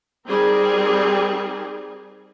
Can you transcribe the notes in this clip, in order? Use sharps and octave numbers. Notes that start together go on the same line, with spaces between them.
G3 C4 D#4 G#4 A#4